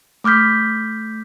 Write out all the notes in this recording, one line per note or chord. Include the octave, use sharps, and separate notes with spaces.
A3 D6 F6 G6 B6